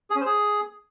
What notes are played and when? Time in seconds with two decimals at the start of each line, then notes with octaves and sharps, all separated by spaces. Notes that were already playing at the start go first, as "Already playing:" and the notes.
0.10 G#4
0.16 C#4
0.21 C5
0.26 G#4